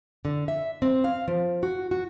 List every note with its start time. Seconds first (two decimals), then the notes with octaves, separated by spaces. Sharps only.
0.25 D3
0.48 E5
0.82 C4
1.04 F5
1.28 F3
1.63 F#4
1.91 F#4